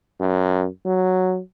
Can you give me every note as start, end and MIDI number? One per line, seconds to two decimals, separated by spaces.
0.20 0.66 42
0.86 1.40 54